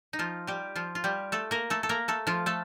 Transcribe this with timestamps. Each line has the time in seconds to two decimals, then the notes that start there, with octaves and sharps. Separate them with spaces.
0.13 D#4
0.19 F3 F4
0.47 G3 G4
0.76 F3 F4
0.95 F4
1.04 G3 G4
1.32 A3 A4
1.51 A#3 A#4
1.70 A3 A4
1.83 A4
1.89 A#3 A#4
2.08 A3 A4
2.27 F3 F4
2.46 A3 A4